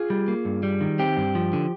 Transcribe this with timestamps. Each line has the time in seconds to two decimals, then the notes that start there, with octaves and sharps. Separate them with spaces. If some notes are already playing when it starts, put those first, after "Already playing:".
Already playing: F4 G#4
0.10 G3
0.28 A#3
0.45 G2
0.63 G3
0.81 D#3
0.99 C4 G4
1.17 G2
1.35 F3
1.53 D3